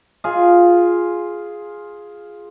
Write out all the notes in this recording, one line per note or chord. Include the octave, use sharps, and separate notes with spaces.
F4 G#4